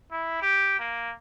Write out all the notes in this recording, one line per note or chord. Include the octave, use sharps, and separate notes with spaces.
E4
G4
A#3